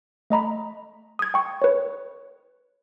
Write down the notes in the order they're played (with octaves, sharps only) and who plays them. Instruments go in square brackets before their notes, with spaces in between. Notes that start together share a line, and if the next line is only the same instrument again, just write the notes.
[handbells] A3 D#5 A#5 B5
D#6 G#6
G5 C#6
B4 C#5